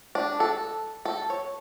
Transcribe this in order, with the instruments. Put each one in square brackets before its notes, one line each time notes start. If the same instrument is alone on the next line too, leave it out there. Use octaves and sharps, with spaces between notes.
[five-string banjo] D4
A4
A4
C#5